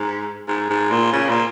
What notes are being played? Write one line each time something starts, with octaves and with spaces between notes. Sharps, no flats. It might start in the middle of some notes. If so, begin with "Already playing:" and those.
Already playing: G#2
G#2
G#2
A#2
C#3
A#2